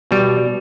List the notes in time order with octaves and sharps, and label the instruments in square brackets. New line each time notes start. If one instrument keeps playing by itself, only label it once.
[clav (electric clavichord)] B2 G3